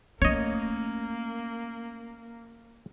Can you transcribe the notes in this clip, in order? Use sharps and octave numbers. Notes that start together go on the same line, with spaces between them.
A3 A#3 C#4 C#5 D#5